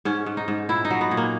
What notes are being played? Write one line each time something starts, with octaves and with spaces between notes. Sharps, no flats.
G#2 C#4
G#2
D#4
G#2
A#2 E4
D#4
F#3
B3
A#2
A#3